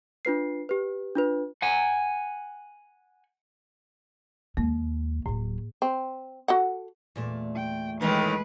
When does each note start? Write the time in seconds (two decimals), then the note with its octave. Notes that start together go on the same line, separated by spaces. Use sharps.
0.25 D4 F4 B4 C7
0.69 G4 B4
1.15 D4 F4 B4
1.62 F#5 G#5
4.57 D#2 G#3 A#3
5.26 D1 A2 F#3
5.82 C4
6.48 F#4 A4 F#5
7.16 E2 A#2 A3
7.56 G5
8.01 A2 D#3 E3 G#3 B4